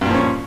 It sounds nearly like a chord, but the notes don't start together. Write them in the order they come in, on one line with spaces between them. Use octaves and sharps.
G2 A#2 F3 C#4